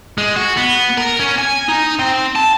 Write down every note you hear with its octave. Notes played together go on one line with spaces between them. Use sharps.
G#3
F#4
B3
A#4
C#4
G#5
D#4
C4
A5